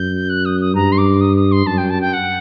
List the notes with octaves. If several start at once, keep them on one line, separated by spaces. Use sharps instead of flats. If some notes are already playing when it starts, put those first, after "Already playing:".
Already playing: F#2 G6
F#6
D#6
D#6
G2 A#5
C6
D6
D#6
D#6
C6
F#2 A5
G5
A5
G5
F#5